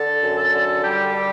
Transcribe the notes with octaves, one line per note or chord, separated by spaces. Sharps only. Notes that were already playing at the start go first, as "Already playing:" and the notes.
Already playing: D3 A4 A5
F#2
A4 A5
D3
G3 G4 G5
D3